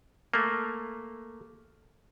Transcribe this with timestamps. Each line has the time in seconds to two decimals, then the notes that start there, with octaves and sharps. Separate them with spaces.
0.34 A3 A#3